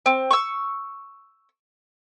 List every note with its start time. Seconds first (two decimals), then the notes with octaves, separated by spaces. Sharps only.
0.06 C4
0.31 C#6 E6